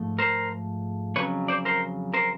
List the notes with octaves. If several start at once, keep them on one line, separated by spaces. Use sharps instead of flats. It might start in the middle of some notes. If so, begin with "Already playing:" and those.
Already playing: G#2 F3 A3
A#4 C5
F2 C#3 F#3 B4 C#5
C5 D5
A#4 C5
A#4 C5